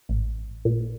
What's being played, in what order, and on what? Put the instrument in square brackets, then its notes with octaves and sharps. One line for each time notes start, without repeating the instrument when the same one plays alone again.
[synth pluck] A1
A#2